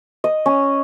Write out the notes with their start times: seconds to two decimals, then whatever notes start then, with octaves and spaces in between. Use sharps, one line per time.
0.24 D#5
0.46 C#4